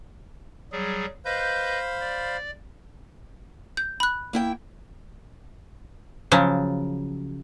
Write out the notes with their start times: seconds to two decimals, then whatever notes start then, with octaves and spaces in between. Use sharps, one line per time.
0.72 F#3 G3 G#4
1.25 B4 C5 D#5 F5 B5 G6
2.01 D5
3.77 G6
4.00 B5 F#6
4.33 A#3 E4 G5
6.32 C#3 F3 F#3